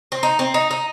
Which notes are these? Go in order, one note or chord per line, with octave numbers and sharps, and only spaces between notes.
C4
D#4
C4
D#4
D#4